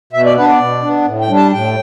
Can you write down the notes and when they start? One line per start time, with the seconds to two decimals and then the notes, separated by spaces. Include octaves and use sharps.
0.13 B2 E5
0.25 D5
0.36 B3 D4 B4
0.48 D5
0.60 B2
0.82 B3 D4
1.06 A2
1.21 G5
1.29 G3 D4
1.36 A5
1.52 A2 G5